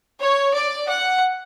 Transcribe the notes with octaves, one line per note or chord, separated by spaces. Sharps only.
C#5
D5
F#5